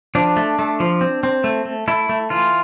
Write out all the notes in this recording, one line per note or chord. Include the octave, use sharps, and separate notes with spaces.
F3 D4
A3
A3
F3
C4
C4
A3
A3
A3 E4
A3
E3 F4